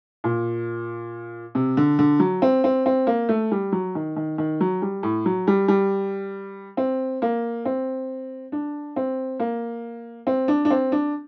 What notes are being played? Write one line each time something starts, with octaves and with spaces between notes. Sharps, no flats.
A#2
C3
D3
D3
F#3
C4
C4
C4
A#3
A3
G3
F#3
D#3
D#3
D#3
F#3
G3
A2
F#3
G3
G3
C4
A#3
C4
D4
C4
A#3
C4
D4
D4
C4
D4